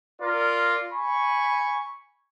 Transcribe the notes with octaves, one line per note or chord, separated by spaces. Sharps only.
F4 A#4 D5
G#5 B5 C#6